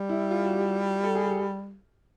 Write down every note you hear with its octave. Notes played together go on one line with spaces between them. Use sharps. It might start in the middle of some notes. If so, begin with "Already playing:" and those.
Already playing: G3
E4
F4
F#4
G4
A4
G#4
G4